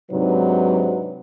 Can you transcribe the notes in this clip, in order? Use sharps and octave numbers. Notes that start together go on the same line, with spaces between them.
G#2 C3 F#3 D4 D#4 B4